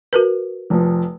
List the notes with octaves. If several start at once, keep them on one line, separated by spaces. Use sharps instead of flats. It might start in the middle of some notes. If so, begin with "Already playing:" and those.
F#4 A#4 B4
F1 F3